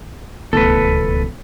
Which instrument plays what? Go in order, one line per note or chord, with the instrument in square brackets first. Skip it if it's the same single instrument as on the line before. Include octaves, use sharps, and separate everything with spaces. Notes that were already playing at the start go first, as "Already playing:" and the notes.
[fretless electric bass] D1 A3 B3 [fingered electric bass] C#2 B2 E3 [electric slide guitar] A4 B4